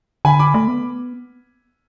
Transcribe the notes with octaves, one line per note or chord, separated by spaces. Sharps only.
D3 G#5 B5
B5 D6
A3
B3